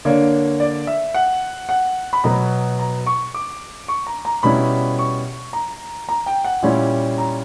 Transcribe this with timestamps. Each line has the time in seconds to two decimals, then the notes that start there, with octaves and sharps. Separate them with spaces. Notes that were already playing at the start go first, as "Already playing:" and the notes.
0.05 D3 A#3 D4 C#5
0.60 D5
0.87 E5
1.14 F#5
1.69 F#5
2.13 B5
2.24 B2 F#3 B3 A#5
2.79 A#5
3.07 C#6
3.34 D6
3.88 C#6
4.07 A#5
4.25 A#5
4.43 B2 G3 C#4 E4 B5
4.99 C#6
5.53 A#5
6.09 A#5
6.26 G5
6.44 F#5
6.62 A#2 G3 C#4 E4
7.18 A#5